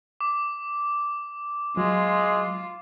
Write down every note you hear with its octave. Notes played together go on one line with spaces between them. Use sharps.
D6
F#3 G#3 F4